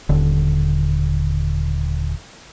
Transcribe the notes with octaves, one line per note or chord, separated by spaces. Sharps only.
D#1 D3